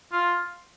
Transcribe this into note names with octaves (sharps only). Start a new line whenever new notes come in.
F4